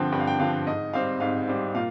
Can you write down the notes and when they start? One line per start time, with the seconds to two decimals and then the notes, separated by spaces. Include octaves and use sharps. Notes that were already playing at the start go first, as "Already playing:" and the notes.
Already playing: G2 D3 F3 C4 G5
0.12 G2 G5
0.20 F5
0.27 G5
0.39 D3 F3 C4 F5
0.67 G#2 D#5
0.93 G3 C4 F5
1.20 G#2 F5
1.48 G3 C4
1.75 A#2 F5